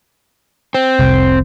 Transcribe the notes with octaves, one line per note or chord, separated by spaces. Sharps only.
C4
F1 C2